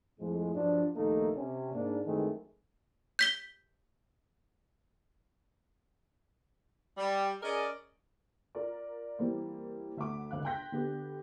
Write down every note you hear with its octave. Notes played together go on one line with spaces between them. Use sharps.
F2 A2 F3 G#3
G2 F3 F#3 D4
A#1 D#2 A3 A#3 D#4 A4
C3 C#4
G#2 A#3 D4
F#2 D#3 E3 G#3 A3 C4
G6 B6 G7
G3
C#4 G#4 A#4 D5 D#5
F4 A#4 D5
E3 G3 A#3 C4
D2 E5 F#5 D6
G1 C#2 F5 F#6
G5 C6 F#6 G6 A#6 B6
D3 B3 G4